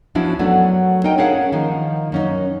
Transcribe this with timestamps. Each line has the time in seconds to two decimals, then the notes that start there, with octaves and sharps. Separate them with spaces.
0.15 F3 B3 C#4 D4 E4 F#4
0.39 F#2 F#3 A3 B3 D4
1.04 D#4 A#4 D#5 G5
1.18 C#4 D4 G#4 A#4 F5 F#5
1.52 D#3 F3 A#3 D#4
2.12 F#2 C#4 D#4